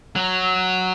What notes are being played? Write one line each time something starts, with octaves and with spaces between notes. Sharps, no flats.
F#3